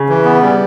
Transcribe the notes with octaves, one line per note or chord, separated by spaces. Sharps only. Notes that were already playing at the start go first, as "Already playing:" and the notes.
Already playing: C#3
E3
B3
G3